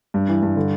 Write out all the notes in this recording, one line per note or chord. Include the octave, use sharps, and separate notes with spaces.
G2
E3
G2
D3